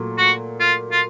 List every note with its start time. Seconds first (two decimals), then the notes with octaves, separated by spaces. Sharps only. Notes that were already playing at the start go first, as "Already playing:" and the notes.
Already playing: A#2 F#3 A3
0.18 F#4
0.60 F4
0.92 F4